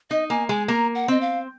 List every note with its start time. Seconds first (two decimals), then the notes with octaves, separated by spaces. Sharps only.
0.10 D#4 D#5
0.30 A#3 G#5
0.49 G#3 G#5
0.68 A#3 A#5
0.95 F#5
1.08 C4 D#5
1.21 F5